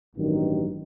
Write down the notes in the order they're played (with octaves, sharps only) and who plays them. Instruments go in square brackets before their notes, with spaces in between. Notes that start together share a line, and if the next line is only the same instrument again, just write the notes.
[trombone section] A1 G2 D#3 F#3